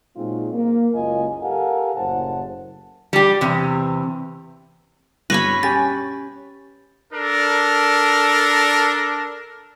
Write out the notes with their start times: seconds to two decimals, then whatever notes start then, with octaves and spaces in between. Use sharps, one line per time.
0.16 A#2 F#3 G#3 C4 D#4 F4
0.54 A#3
0.95 F#1 C#2 A#3 F4 D#5 G#5
1.41 G4 A4 A#4 F5 F#5 G#5
1.96 F#1 A2 C#3 C5 F#5 A5
3.13 G3 G4
3.41 E2 C3
5.30 G2 B2 B4 C#5 B5 A#6
5.63 C#4 G4 G#5 A6
7.12 D4 A4 A#4